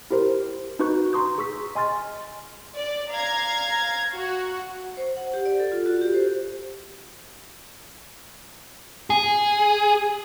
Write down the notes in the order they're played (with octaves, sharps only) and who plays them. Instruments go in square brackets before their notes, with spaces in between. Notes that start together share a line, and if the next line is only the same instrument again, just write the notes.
[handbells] E4 G4 A#4 C5
D4 D#4 F#4 B4 C#6 G6
A#5 C6 C#6 D#6 G6
G#4 C#6 E6 B6
D#5 G#5 C6 F6 A6
[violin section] D5
F5 A#5 G#6
F#4
[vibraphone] C5
F#5
G4
D5
A4
F4
F#4
G4
C5
[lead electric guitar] G#4